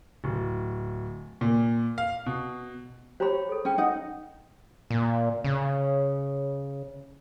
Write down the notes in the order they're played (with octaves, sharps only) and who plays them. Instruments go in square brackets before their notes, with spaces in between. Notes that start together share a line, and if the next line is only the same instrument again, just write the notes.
[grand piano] D1
A#2
F5
B2
[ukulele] G4 C#5 [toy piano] C5 A#5 B5
[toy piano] G#4 A4
[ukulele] C#4 [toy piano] G#4 C#5 G5
[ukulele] D#4 F#5
[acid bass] A#2
C#3